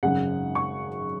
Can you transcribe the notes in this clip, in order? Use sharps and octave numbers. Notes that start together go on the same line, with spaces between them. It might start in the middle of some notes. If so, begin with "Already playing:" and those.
G#1 F#2 C#3 F#5
C#6